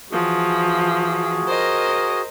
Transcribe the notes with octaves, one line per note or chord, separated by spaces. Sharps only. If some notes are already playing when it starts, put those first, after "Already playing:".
E3 F3 F#4 G#4
A#4 C5 D#5